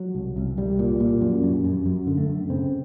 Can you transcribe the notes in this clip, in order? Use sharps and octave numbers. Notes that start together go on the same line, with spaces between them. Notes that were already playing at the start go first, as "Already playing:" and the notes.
Already playing: F#3
C2
C2
C2 G3
A#2
A#2
F#2
F#2
F#2
F#2
D3
A3
F#2
C#3 C4